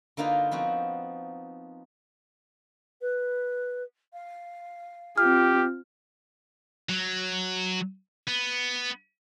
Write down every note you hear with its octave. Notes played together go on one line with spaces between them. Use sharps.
D3 A#3 D#4 F4 B4
F3 B3 C4 F#4
B4
F5
C4 F4 G4 F6
F#3
B3